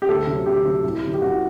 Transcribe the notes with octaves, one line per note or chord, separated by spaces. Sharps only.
G4
D2 A4
C3 F#3
D2 G4
C3 F#3
C2
C3 F#3
G4
C2 F#4